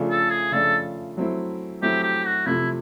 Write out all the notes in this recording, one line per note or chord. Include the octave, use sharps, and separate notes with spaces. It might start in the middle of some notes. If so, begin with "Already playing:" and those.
Already playing: C#3 F3 A3 D4 F4
A4
G#4
C#3 F3 A3 D4 F4 A4
F#3 A3 C4 E4
F#3 A3 C4 E4 G4
G4
F#4
C3 F3 A3 C4 E4